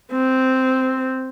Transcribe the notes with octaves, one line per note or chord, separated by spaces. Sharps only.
C4